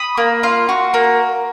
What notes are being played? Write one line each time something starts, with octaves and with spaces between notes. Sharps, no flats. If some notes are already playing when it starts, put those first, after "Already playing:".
Already playing: B5 D#6
A#3
F4
F#4
A#3